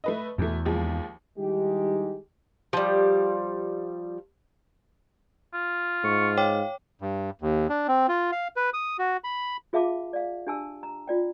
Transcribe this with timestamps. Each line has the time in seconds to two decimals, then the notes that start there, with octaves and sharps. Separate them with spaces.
0.04 A3 B4 D#5
0.38 E2 B2 A3
0.65 D#2 F3 G#3
1.38 D#3 G3 G#3 D#4 E4 G4
2.73 F3 G3
5.54 F4
6.04 G#2 C#6
6.37 C#5 F5 G5 D6
7.01 G2
7.42 D#2
7.70 D4
7.88 C4
8.08 F4
8.32 F5
8.56 B4
8.74 D#6
8.99 F#4
9.24 B5
9.73 F4 G#4 E5 F5 A5 D6
10.13 D5 F5
10.47 D4 G4 G#5 A5 E6
10.83 A#5
11.08 F4 D5 G5